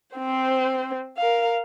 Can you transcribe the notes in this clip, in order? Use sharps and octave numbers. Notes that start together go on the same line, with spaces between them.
C4 C5
A#4 F5